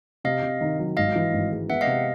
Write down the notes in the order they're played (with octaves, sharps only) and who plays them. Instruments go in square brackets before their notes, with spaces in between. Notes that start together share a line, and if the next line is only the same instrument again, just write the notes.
[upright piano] C3 [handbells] D#5 F5
[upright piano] C3
D#3
F#3
[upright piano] G#1 [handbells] D#5 F5
[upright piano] E3
G#1
G#3
[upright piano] B3 [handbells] E5 F#5
[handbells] D#5 F5
[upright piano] C3